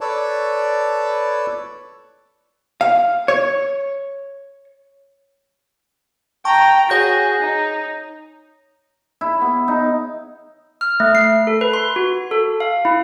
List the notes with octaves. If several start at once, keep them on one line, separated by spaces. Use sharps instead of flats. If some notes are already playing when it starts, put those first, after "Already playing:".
A4 B4 C#5 D5 A5
F5
C#5
G5 A5 A#5 C#6
F#4 G#4 C#5 G6 A#6
D#4
E4
B3
D#4
F6
A3
C7
A4
B4
C6
F#4
A4
F5
E4